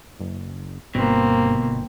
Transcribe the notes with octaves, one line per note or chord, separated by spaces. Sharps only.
F#1
G1 G2 B2 A#3 C4